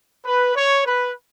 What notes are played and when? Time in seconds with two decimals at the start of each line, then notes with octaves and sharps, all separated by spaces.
0.25 B4
0.55 C#5
0.85 B4